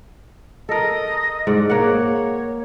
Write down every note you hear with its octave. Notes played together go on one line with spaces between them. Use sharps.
A4 A#4 D#5
G#2 D5 F#5
A#3 C#5 F#5